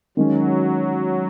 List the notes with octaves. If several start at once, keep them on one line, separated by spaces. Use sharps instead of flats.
D#3 F#3 G#3 C#4